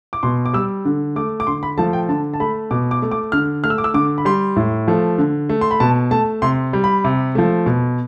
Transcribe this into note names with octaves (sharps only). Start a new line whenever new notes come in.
D6
B2 C6
D6
G3 E6
D3
A3 D6
D6
D3 C6
B5
F3 A3 A5
G5
D3 A5
A5
A3 B5
B2 D6
D6
A3
D6
D3 F6
A3 F6
E6
D6
E6
D3 D6
B5
G3 C6
A2
F3 A3
D3
A3
C6
B5
B2 A5
A3 A5
C3 C6
G3
B5
C3
F3 A3
B2